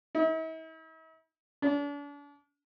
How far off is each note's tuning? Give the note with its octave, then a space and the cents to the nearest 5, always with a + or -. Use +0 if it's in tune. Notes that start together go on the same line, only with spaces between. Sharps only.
E4 -45
D4 -40